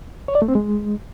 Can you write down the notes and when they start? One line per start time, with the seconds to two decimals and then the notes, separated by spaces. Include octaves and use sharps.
0.28 C#5
0.35 D5
0.42 A3
0.48 C4
0.55 G#3